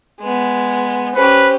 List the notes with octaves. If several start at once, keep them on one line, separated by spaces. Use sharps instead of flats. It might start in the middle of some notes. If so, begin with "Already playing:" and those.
G#3 B3
C#4 G4 B4 C5